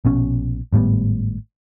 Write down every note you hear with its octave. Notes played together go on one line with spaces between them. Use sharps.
A#1 B2 C#4
G#1 A2 G3 B3